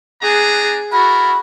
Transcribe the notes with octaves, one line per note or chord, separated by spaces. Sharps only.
B3 D4 G#4 A#5
E4 F#4 A4 A#4 B5